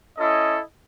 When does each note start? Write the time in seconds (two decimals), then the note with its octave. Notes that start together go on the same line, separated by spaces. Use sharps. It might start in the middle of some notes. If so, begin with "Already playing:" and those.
0.17 C#4 E4 A4 D#5